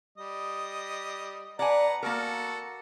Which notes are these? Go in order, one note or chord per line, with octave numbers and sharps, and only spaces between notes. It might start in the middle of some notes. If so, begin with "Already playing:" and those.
G3 D#5
B4 D5 F#5 G#5 A#5
A#3 F#4 A4 A#4